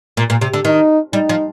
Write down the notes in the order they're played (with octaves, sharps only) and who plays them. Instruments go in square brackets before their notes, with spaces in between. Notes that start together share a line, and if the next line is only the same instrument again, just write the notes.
[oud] A#2
A#2
C3
D3
[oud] D#3 [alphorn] D#4
[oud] G3 [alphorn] D#4
[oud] F3